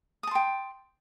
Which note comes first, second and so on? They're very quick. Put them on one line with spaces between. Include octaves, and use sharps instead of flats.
D#6 A5 C6 G5